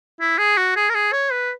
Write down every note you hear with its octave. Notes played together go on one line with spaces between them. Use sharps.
E4
G#4
F#4
G#4
A#4
G#4
C#5
B4